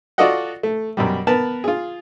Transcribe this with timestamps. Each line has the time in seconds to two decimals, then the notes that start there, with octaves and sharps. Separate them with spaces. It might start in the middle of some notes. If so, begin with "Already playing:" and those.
0.18 F4 F#4 A4 D5 D#5 F#5
0.63 A3
0.97 F#2 B2 G3
1.27 B3 A#4 B4 A5
1.64 F4 G#4